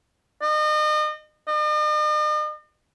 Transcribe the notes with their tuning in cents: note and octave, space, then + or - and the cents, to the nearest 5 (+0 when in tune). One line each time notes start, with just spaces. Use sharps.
D#5 -35
D#5 -45